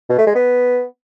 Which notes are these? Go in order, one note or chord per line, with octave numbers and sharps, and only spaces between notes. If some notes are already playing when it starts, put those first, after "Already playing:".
B2
A3
G#3
B3